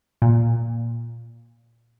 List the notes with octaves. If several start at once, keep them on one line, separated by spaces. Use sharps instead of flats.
A#2